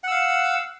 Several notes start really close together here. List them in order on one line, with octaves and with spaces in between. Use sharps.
F#5 E6 F5